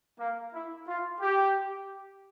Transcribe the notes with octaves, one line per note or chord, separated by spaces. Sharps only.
A#3
E4
F4
G4